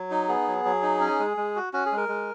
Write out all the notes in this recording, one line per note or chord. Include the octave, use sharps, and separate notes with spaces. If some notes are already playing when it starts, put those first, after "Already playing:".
Already playing: F#3
D#4
B3 G#4
F#3
F#3
D#4
C#4
G#3
G#3
F#4
C#4 F#4
G#4
G#3 A#4
G#3